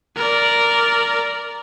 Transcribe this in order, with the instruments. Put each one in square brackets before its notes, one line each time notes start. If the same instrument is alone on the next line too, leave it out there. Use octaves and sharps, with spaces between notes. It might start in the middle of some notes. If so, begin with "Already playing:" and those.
[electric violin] A#4 D5